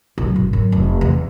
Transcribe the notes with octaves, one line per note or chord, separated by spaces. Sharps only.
B1
G#1
F#2
F1
E2